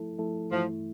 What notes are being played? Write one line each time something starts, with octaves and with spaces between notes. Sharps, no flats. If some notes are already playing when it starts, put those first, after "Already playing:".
Already playing: F3 A3 E4 A4
F3 A3 E4 A4
G2 E3 F3 A3 E4